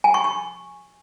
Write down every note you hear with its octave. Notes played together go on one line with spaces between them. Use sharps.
G#5
C#6
C#6